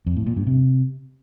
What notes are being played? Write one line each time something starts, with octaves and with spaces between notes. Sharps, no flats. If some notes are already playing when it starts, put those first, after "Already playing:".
F2
A2
A#2
G2
C3